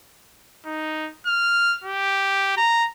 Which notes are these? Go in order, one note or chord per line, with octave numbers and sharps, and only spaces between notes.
D#4
F6
G4
A#5